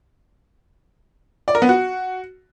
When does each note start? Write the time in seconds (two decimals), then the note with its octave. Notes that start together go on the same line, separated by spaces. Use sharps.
1.48 D5
1.55 A#4
1.62 B3
1.69 F#4